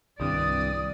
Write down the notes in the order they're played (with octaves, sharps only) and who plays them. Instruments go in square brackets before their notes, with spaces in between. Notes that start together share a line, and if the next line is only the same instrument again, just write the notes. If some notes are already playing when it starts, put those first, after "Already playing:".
[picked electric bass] C2 G2 [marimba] D#3 C4 [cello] D5 [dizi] D#6